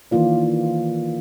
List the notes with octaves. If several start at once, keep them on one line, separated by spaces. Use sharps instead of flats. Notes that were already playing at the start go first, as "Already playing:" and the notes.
D#3 E3 A#3 F4 D5